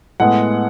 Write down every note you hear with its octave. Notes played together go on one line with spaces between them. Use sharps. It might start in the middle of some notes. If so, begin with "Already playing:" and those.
A2 G#3 B3 F#5